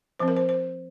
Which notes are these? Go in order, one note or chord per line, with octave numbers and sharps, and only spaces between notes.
F3 C4 C5
A#4
C5
C5